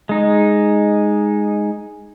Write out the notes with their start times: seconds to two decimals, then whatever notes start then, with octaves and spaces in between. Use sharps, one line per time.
0.09 G#3 D#4